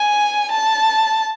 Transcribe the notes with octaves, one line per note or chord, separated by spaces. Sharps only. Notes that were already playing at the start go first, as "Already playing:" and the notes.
Already playing: G#5
A5